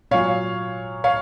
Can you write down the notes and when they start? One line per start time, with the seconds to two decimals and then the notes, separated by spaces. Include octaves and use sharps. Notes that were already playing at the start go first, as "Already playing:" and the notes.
0.11 A#2 F#3 C#5 F5
1.04 C#5 F5